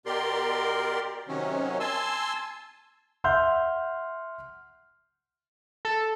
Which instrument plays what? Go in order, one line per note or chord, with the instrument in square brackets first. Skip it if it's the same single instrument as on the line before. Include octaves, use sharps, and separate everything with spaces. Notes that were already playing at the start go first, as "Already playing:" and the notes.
[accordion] B2 G4 A#4 D5 C6
C3 D#3 F#3 C#4
G#5 A5 C6 E6
[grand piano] E5 F#5 C6 E6 F6 G6
[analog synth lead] A4